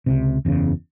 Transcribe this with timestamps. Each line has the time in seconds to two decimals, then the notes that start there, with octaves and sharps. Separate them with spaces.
0.06 C#2 C3
0.45 F#1 E2 C#3